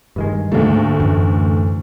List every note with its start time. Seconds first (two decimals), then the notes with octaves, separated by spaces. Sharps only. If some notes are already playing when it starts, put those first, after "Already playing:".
0.16 G2 D#3 G#3
0.52 D2 G#2 A3 A#3
1.00 F#2 A2 E3